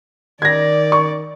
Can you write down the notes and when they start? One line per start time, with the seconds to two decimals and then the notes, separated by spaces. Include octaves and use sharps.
0.42 D#3 D5 G#6 A#6
0.92 C#6